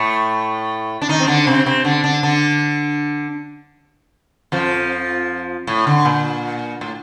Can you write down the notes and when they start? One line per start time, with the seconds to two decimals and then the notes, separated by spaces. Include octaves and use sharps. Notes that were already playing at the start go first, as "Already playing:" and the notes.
Already playing: A2 A3
1.02 D4
1.09 D#3 D#4
1.20 C4
1.27 D3 D4
1.47 C3 C4
1.66 C3 C4
1.85 D3 D4
2.04 D3 D4
2.23 D3 D4
4.52 F2 F3
5.67 A2
5.87 D3
6.05 A#2
6.81 A2